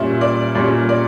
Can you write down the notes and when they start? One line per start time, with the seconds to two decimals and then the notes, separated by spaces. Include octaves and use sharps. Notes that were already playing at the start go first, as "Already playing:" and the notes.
Already playing: A#2 G3 C#4 E5
0.21 D5
0.55 A#2 G3 C#4 C#5
0.89 D5